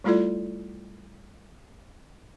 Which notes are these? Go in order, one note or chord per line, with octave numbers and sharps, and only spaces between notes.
G3 A3 E4 F4 A4 D5